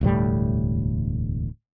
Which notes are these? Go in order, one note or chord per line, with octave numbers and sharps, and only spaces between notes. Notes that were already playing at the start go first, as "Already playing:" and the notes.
E1 D2 A2 G3